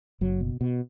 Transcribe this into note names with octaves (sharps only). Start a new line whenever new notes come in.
F#1 F#3
B2
B2